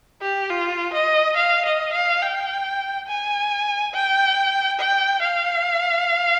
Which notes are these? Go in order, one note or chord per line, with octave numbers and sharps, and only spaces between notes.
G4
F4
D#5
F5
D#5
F5
G5
G#5
G5
G5
F5